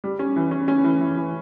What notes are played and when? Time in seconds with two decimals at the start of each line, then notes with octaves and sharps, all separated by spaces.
0.04 G3
0.19 C#4
0.36 E3
0.51 C#4
0.68 C#4
0.84 E3
1.00 E3
1.17 E3